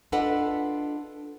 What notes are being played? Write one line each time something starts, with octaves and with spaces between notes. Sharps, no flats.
D4 F4 A4 B4 D#5 F#5